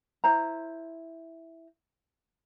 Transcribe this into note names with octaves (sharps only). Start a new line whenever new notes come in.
E4 C5 A#5